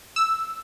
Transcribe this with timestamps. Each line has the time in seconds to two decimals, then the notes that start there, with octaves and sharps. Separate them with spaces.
0.16 E6